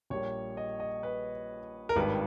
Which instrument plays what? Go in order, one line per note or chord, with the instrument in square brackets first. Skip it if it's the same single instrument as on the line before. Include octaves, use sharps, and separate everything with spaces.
[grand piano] A#1 A#2 G3 C#5
D#5
D#5
B4
A#4
G#1 G2 D#3 G3 B4